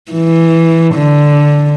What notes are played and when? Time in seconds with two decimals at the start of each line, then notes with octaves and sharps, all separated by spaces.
0.12 E3
0.95 D3